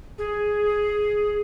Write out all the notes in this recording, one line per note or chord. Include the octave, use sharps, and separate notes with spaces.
G#4